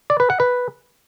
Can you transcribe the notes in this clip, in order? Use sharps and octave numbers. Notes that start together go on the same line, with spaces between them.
D5
B4
F#5
B4